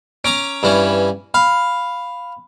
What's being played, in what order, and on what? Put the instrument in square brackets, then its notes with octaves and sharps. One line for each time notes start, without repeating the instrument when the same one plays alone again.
[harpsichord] C#4 A#5 D6 [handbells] D7
[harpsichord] G2 E3 C#4
[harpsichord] F5 [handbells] B5